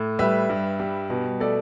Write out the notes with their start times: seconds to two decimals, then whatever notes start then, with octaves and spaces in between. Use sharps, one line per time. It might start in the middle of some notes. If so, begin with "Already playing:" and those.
Already playing: A2
0.19 G3 B4 E5
0.49 G2
0.80 G3
1.10 B2
1.40 A3 A4 D5